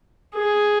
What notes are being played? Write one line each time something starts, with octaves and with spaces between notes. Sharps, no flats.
G#4